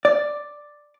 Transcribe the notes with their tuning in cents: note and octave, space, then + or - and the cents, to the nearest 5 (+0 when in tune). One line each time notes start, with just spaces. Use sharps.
D5 +5